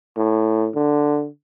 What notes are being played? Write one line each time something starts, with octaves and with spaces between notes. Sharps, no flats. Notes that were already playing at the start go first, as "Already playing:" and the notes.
A2
D3